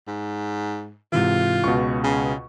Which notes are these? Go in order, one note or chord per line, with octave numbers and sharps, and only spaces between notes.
G#2
G#2 C3 E3 F4
C#2 B2 C#6
C#3